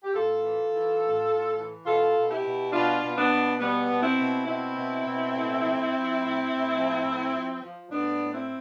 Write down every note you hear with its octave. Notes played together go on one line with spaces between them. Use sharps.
G4
A2 F4 A4
E3
E3
A2
A2
E3
B2 F4 A4
B2
E4 G4
B2
B2 D4 F4
B2
B3 D4
B2
B2 G3 B3
B2
C4 E4
B2
B2 C4 E4
B2
B2
A2
F3
F3
A2
A2
F3
A2
F3
F3
A2 B3 D4
A2
C4 E4